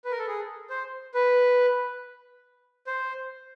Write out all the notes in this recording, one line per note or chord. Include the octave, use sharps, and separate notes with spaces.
B4
A#4
A4
G#4
C5
B4
C5